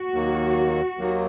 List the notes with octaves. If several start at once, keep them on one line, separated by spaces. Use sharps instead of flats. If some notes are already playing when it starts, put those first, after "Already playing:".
Already playing: F#4
D#2 D#3 F#3 A#3
D#2 D#3 F#3 A#3